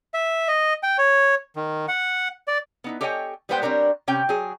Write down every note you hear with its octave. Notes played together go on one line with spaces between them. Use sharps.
E5
D#5
G5
C#5
D#3
F#5
D5
B3 D#4 E4
G4 A4 C#5 D#5 G5 G#5
G3 G#3 B3 B4 C5 G5
G3 C4 D4 A#4 C#5
C3 C#4 G4 G5
F#3 G#4